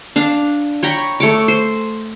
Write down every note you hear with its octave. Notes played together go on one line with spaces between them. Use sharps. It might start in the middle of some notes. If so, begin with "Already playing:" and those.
D4 F5
C#5 G5 A#5 B5
A3 C#5 D6
C5